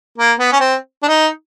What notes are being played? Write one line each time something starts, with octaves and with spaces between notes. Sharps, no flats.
A#3
B3
C#4
C4
D4
D#4